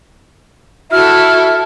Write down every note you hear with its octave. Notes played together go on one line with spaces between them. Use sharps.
E4 F#4 A4 E5 F6